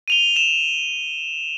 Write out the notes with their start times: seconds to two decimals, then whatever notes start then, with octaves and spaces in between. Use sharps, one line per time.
0.08 D#7 F7 G7
0.36 E7